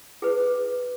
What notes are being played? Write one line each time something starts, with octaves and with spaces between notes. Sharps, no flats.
G#4 B4